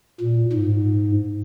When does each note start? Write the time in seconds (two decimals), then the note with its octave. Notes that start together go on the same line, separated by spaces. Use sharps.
0.20 A#2
0.53 G#2